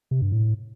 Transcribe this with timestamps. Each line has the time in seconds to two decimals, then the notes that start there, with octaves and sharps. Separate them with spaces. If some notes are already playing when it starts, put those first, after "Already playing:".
0.11 C3
0.22 G2
0.32 A2